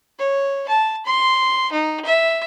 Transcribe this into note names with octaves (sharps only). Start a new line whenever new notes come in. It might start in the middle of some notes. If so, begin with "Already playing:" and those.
C#5
A5
C6
D#4
E5